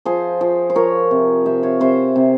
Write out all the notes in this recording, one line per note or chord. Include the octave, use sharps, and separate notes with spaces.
F3 G#4 C5
F3
C5
F3 A#4 C#5
C3
C3 C5 E5
C#5 F5
C3 C5 E5
C3